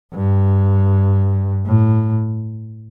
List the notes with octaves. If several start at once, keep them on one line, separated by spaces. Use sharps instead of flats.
G2
A2